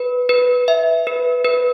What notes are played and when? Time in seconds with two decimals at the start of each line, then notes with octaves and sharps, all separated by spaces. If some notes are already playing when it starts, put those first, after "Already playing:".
Already playing: B4
0.29 B4
0.68 E5
1.07 B4
1.45 B4